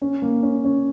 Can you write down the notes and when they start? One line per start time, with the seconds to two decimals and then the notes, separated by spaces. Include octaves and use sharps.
0.02 C#4
0.22 A#3
0.43 C#4
0.65 C#4